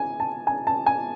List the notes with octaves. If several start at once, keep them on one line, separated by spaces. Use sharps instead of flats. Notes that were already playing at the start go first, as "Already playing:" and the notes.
Already playing: G#5
A5
G#5
A5
G#5